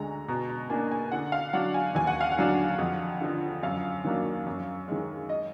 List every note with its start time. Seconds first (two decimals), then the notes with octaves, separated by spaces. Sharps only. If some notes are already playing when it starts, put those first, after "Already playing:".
Already playing: D2 D3 G#3 A#5
0.28 B2 A#5
0.49 A#5
0.70 A#3 D4 G#5
0.91 G#5
1.12 D3 F#5
1.32 F5
1.53 F#3 D4 F#5
1.74 G#5
1.95 D#2 G#5
2.07 F#5
2.21 F5
2.32 F#5
2.38 D3 F#3 D4
2.78 F2
3.21 D3 F3
3.63 F#2 F5
4.04 D#3 F#3 A#3 D4
4.47 F#2
4.88 D#3 G#3
5.29 D#5